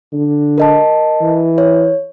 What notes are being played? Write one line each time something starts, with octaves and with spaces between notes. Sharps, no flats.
D3
A#4 D#5 A5
E3
C#5